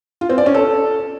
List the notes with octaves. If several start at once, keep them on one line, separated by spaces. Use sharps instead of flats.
F4
C4
D5
C#4
A4